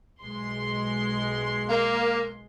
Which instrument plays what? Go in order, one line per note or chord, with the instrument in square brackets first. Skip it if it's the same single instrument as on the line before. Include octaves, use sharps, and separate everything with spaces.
[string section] B1 G#3 C6
[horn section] A#3